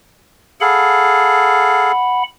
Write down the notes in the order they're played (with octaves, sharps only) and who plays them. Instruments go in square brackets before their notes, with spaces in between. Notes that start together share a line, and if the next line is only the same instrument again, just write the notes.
[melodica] G#4 A4 F5 [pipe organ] F#5 B5